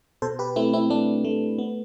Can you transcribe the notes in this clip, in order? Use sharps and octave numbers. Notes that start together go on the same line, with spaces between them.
B2 A4 C5
G4 B4
A3 C4 E4
C4 E4
A3 D4
A3
B3